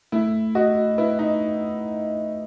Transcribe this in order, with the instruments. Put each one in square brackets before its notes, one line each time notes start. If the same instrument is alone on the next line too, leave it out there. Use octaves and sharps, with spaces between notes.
[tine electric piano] A3 [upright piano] E4
[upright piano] F#4 [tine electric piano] D#5
[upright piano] E4 [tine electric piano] B4
[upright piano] D#4